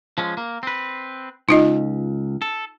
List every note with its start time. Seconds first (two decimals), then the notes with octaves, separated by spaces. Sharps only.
0.18 F3 G#3 C#4
0.37 A#3
0.63 C4 B4
1.49 C#2 D#4 F4 D#5
2.42 A4